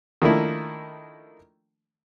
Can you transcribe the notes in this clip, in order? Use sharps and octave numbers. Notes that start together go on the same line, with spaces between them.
D#3 F3 A3 A#3 D4 E4